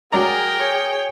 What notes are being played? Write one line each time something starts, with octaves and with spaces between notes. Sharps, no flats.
F#3 G#4 A#4 D5 G5 A#5
G#4 C#5